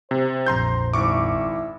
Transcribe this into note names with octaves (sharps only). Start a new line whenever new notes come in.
C3 C5
A#1 F2 A#5 C6 G6
G#1 E4 C#6 D6